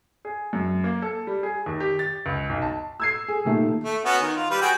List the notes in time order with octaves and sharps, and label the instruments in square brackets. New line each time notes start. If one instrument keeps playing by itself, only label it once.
[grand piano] G#4
F#2
A#3
A4
G3
G#4
D#2
G4
A6
C#2
B1
A5
[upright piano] E6 G#6 C7
G#4
D#2 A#2 D#3 A3
[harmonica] A3
B3 C#4 F#4
D#3
F4
G3 B4
F#4 G#4 G5